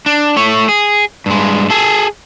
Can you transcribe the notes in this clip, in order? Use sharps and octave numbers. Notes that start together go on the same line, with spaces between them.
D4
A3 C#5
G#4
G2 G#3
G#4 A4